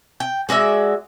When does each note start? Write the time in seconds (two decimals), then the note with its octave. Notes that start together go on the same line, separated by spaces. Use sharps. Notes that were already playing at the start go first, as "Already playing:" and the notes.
0.20 G5
0.49 G#3 F#4 D5 E5